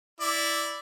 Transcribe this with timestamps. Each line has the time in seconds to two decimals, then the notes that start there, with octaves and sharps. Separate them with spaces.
0.21 E4 D5